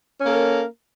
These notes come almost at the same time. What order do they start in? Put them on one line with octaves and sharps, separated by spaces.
C#4 A#3 A4 A#4